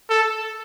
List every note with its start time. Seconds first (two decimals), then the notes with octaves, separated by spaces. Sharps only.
0.10 A4